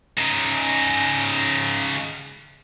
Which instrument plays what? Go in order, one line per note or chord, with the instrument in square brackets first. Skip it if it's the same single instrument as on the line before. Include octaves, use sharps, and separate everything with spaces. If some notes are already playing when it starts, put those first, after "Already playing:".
[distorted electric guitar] C#3 D#4